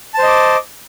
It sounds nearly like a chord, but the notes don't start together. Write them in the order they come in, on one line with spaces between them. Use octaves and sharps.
A5 C5 D#5 D6